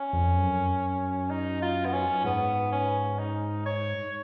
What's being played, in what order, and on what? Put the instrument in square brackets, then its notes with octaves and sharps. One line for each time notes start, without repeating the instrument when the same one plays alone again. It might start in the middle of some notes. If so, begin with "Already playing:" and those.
Already playing: [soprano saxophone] C#4
[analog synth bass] F2
F#2
[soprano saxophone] D#4
F4
B3
C#4
[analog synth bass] G#2 [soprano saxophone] B3
[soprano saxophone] C#4
D#4
C#5